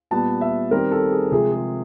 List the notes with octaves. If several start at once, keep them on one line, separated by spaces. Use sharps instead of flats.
A#2 G3 B3 A5
E5
D#3 G3 C4 A#4
A4
G#4
C3 F3 G#3 G#4
G#4